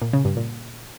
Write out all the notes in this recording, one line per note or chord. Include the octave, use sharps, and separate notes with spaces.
A#2
C#3
G2
A#2